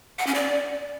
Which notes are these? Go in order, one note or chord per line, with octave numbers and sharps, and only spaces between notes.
F#5
C#4
D5